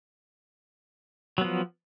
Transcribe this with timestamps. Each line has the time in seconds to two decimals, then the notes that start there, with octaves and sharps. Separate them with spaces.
1.38 F#3
1.41 B3
1.44 F3